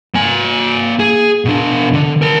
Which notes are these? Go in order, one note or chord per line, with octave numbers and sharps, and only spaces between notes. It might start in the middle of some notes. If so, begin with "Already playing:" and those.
A#3 G#5
G#4
B2 D4
D3
A#4 A5